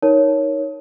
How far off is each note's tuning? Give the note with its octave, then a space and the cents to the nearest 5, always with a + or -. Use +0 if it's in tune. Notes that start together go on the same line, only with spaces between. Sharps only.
D#4 +10 A#4 +0 C#5 +0